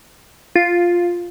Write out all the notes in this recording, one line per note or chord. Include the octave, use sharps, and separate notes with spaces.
F4